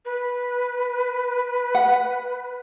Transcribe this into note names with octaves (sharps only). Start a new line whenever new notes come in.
B4
F#5